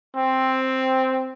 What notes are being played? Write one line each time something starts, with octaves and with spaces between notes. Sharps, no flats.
C4